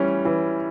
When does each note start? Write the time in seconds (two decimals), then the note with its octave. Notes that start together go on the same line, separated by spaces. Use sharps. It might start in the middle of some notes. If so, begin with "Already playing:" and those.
Already playing: E3 G3 C#4
0.25 E3